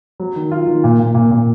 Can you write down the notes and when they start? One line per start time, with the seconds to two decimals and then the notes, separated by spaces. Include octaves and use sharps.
0.20 F#3
0.36 D#3
0.52 F4
0.67 D#3
0.84 A#2
0.99 A#2
1.14 A#2
1.31 A#2